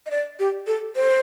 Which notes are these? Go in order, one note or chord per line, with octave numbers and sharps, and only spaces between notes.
D#5
D5
G4
A4
C5